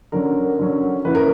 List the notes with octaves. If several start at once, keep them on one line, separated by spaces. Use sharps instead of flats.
D3 F#3 C#4 A#4
D3 F#3 C#4
E3 A#3 C#4 E4 B4
A#4